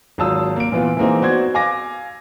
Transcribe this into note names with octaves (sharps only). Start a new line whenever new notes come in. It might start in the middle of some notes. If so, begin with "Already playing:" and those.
G#1 F#3 F4 A5 D#6 E6
A#3 D7
A#2 E3 B3 F4
E3 G#3 A#3 C4 D#4
B3 F#4 C5 D5 G#6
F5 G#5 D6 A#6